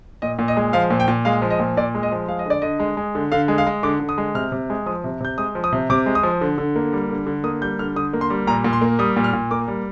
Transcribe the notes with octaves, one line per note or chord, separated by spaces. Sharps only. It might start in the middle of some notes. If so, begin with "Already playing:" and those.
A#2 D#5
A#2
D#5
G#3
F3 F5
A#2
G5
A#2
G#3 F5
F3
D#5
A#2
A#2 D5
G#3
D#5
F3
G#3 F5
D#5
D3 D5
D3 D#5
G#3
G#3
D3
D3 F5
G#3
F5
G#3
D3 D6
D3
D#6
G#3
C3 F6
C3
G#3
F3 D#6
C3
C3 G6
G#3 D#6
F3
D#6
C3
C3 D6
G#3
D#6
F3
D3
D3
A#3
G3
D3
D3
A#3 D#6
G3 G6
D3 F6
D3 D#6
A#3
C6
G3
A#2 A#5
A#2
C6
A#3
G3 D#6
A#2
F6
A#2
A#3 D6
G3